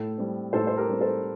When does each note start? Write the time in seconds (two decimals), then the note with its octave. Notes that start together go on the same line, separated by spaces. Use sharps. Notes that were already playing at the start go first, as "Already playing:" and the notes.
Already playing: A2 A4
0.18 G3 C4
0.53 A2 A4 C5
0.67 C5
0.77 G4 A#4
0.89 G3 C4
1.01 A4 C5